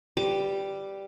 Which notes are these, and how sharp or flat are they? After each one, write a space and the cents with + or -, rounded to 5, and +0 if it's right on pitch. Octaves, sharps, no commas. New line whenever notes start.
G3 +0 B4 +15 D6 +5